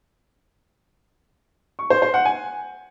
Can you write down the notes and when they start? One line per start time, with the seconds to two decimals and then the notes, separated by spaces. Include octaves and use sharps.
1.79 C#6
1.90 C5
2.02 C5
2.14 F#5
2.25 G#5